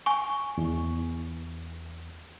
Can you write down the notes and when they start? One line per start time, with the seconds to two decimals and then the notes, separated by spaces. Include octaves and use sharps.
0.06 G#5 C#6
0.58 E2